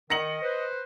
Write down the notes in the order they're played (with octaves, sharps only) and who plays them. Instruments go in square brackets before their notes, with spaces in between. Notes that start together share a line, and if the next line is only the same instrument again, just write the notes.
[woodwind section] D#3 [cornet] D#5 [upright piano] A#6 C#7 F#7
[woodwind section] B4 C5